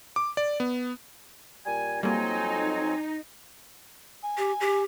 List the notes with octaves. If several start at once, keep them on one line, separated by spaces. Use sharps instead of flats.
D6
D5
B3
A#2 G3 G#5
F2 F#3 G3 A#3 C4 D#4 G#5
G#5
G4
G4